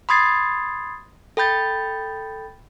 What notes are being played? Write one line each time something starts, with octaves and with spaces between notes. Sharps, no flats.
B5 C6 D#6 G#6 A6 C7
A4 G5 B5 G6 A6